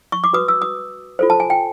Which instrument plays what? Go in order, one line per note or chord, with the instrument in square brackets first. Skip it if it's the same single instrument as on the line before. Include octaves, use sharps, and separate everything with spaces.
[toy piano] C#6
D6
F#4 B4 D#6
E6
D#6
F4 A4 C5
A5
G#5
G5